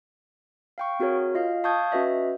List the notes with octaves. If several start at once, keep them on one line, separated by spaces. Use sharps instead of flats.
F5 G5 C#6
C4 F#4 G#4 A#4 C#5
F4 D#5 F5
F5 A5 C#6 D#6 G6 G#6
C#4 F#4 B4 D#5 E5